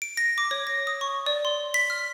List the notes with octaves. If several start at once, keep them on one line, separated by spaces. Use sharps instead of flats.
D7
A#6
D6
C#5
A#6
D#6
C#6
D5
C6
B6
F6